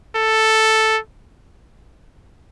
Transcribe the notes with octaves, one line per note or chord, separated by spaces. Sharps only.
A4